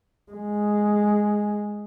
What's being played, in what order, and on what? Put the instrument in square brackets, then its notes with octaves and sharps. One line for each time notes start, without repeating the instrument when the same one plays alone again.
[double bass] G#3